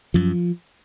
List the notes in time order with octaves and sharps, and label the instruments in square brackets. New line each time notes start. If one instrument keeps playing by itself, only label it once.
[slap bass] F#2 F3